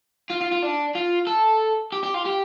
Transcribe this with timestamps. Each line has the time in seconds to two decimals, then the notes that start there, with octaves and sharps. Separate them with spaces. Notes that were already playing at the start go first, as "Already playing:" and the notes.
0.30 F4
0.41 F4
0.51 F4
0.62 D4
0.95 F4
1.27 A4
1.92 G4
2.03 G4
2.14 F4
2.25 G4